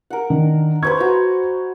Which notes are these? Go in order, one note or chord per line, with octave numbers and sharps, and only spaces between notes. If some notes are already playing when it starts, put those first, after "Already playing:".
A#4 F#5
D#3 D4
B4 C5 D#5 C6 C#6 G#6
F#4 D#5 A#5